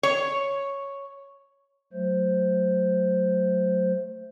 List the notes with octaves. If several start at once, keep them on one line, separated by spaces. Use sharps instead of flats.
C#5
F#3 A3 C5